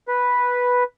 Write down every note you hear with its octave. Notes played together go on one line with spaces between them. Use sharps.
B4